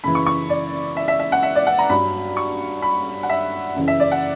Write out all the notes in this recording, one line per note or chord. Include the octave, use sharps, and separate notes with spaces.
F#2 C#3 E3 B5
C#6
C#6
D5
E5
E5
E5
F#5
E5
D5
F#5
A#5
G2 F#3 B5
C#6
B5
F#5
E5
F#2 C#3 E3
E5
D5
F#5